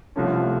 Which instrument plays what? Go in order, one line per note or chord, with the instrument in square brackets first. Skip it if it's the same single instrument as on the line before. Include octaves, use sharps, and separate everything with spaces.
[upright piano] C2 C3 F3 A3 C#4